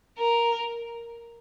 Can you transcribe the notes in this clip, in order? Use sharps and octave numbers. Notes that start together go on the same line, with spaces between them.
A#4